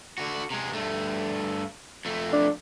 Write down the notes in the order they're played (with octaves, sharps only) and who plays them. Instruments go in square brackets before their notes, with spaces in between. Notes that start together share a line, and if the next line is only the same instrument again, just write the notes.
[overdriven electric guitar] D3 F#4
C3 G#3
G2 A3
F2 A3
[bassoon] D4